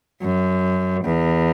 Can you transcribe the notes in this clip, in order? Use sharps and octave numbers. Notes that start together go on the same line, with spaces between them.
F#2
E2